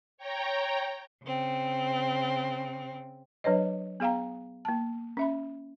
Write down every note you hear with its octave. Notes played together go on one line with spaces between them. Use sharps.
C#5 G5 A#5
C#3 C4
F#3 D4 B4 C#5 D#5
B3 G#4 F5 G5 A#5
A#3 A5
C#4 E5 B5